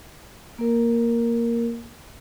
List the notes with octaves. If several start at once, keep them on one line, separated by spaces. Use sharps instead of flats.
A#3 A#4